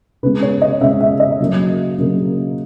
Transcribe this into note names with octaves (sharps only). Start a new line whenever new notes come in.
C#3 G#3 B3 B4
C#5
D#5
C#3 G#3 B3 E5
E5
D#5
C#3 F#3 A#3
C#3 F#3 A#3